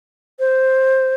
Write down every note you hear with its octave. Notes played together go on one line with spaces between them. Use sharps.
C5